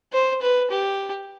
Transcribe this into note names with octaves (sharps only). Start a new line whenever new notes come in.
C5
B4
G4